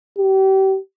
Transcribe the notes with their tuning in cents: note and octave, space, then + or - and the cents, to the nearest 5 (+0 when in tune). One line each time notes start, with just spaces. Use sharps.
G4 -35